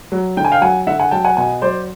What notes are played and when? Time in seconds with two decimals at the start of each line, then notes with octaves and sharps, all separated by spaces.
0.12 F#3
0.37 D3 G5
0.45 G#5
0.52 F5 G5
0.61 F#3 F#5 G#5
0.87 D3 E5 F#5
0.99 F#5 G#5
1.11 F#3 G5 A5
1.24 F#5 G#5
1.37 B2 F#5 G#5
1.62 F#3 C5 D5